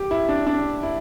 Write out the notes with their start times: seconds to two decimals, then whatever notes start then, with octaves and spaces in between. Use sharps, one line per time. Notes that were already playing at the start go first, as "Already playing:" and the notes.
Already playing: G4
0.11 E4
0.29 D4
0.47 D4
0.83 E4